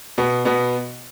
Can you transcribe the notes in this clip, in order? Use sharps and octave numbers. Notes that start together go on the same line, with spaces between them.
B2 B3
B2 B3